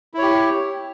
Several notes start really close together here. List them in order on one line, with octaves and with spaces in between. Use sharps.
E4 C#5 G4